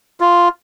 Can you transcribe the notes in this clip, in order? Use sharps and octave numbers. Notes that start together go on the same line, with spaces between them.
F4